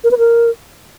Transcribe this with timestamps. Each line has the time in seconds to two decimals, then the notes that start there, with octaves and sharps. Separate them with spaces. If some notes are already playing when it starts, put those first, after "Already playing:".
0.04 A#4
0.11 B4
0.18 A#4